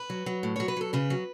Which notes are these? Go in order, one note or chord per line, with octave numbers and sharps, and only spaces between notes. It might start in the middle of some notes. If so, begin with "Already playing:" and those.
Already playing: B4
F#3
F#3
A2
F#3 C#5
B4
F#3 A4
C#3 B4
F#3